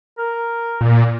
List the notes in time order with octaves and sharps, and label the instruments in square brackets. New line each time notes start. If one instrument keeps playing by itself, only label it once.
[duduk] A#4
[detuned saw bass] A#2